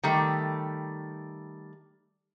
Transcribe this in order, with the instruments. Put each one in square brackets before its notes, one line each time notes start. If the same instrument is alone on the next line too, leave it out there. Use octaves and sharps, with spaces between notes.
[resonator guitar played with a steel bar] D#3 G3 A3